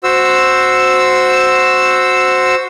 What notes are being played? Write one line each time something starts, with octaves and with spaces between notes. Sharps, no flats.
F#4 C5 E6